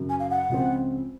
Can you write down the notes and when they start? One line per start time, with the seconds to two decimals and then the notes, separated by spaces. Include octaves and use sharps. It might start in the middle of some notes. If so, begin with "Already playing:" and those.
Already playing: F#2 C#3 F#3
0.09 G#5
0.20 F5
0.30 F#5
0.49 C#2 C#3 F3 C4